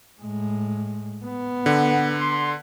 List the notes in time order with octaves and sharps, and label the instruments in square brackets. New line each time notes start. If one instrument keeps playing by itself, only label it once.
[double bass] A2 G#3
B3
[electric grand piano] D3 [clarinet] F#5
[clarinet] C6